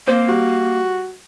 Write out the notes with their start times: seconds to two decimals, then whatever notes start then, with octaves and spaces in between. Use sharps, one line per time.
0.07 A#3 C4 C5
0.29 G3 F#4